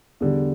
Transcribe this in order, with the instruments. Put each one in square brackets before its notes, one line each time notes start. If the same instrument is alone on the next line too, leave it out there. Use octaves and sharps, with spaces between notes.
[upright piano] E2 D3 G3